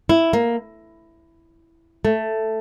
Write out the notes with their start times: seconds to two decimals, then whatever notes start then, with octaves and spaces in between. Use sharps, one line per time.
0.09 E4
0.33 A#3
2.05 A3